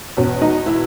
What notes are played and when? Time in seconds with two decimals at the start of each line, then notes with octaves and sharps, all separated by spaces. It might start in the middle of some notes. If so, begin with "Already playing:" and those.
0.17 E2 B2 C#4
0.42 D#4
0.66 E4